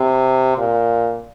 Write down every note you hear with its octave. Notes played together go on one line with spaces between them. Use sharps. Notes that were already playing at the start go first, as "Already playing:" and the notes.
Already playing: C3
A#2